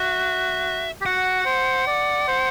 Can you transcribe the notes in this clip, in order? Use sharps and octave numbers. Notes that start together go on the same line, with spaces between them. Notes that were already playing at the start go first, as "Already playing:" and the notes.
Already playing: F#4 E5
G4
F#4 F#5
C5
D5
C5